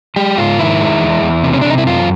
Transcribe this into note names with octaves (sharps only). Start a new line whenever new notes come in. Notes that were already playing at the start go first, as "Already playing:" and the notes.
G#3 G4
G#2 F4
D#3 E4
G#3
E2
E2
C3
C#4
C3 D4
D#4
E4
F#2 F4